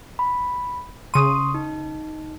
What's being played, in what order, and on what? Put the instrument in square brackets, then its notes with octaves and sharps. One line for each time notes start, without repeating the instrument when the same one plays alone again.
[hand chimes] B5
[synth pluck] C#3 D#7 [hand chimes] C6 C#6 D#6
[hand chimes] D#4